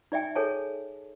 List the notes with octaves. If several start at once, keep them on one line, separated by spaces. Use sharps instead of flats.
D#4 D5 E5 G5 G#5
G#4 A4 C#5 G#5 A5